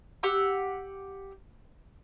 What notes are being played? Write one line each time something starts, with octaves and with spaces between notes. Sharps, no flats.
G4 F#5 E6